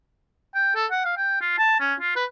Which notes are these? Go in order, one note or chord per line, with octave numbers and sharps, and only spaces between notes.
G5
A4
F#5
F5
G5
F4
A5
C#4
F4
B4